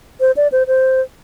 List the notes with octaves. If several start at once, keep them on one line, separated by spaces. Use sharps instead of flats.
C5
D5
C5
C5